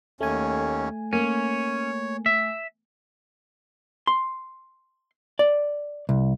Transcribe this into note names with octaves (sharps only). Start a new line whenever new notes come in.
D#2 A3 C#4 G#5
A#3 C#4 C#5
E5
C6
D5
C2